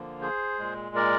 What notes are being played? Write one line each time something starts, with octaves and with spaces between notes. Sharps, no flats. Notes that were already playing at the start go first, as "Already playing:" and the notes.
Already playing: D3 F3 A#3
G#4 C5
A#2 G#3
A#4 D5